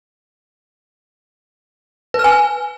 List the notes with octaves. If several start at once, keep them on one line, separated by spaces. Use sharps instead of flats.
B4
F6
G#5